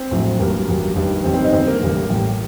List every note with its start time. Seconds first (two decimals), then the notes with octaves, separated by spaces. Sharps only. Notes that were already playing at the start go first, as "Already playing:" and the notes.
Already playing: C4
0.11 A#1 A2 F#3
0.39 A1 G2 F#3 A#3
0.67 A1 G2 F#3
0.96 A1 G2 D#3
1.24 A1 G2 D#3 C4
1.34 C4
1.44 D#4
1.53 A1 G2 D3 C4
1.67 A#3
1.81 A1 G2 D3 A#3
2.09 A1 A2 G3